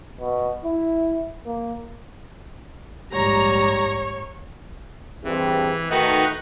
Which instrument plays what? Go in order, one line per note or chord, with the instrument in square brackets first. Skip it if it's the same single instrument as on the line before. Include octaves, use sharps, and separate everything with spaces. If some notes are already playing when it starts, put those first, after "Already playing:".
[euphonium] B2
E4
A#3
[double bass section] A#1 D#2 G#2 [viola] G3 [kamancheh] C#5 [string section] A#5
[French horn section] G2 C4 G#4 [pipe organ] E3
[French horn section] D#3 A3 [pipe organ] D#4 F#4 B4